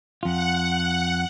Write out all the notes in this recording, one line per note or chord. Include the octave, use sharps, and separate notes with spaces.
F2 F4 F#5